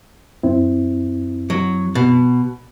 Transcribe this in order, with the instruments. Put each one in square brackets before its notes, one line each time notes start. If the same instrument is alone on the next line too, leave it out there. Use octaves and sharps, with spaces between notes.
[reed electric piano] F#2 C4 E4
[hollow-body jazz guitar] F#3
B2